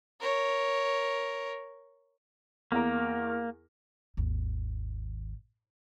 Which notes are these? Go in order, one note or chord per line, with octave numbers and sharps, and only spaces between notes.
A#4 C#5
E2 A#3 A#4
G#1 D#2